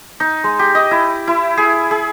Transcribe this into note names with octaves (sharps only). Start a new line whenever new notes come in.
D#4
G#3
G4
D#5
E4
E4
G#4
G#4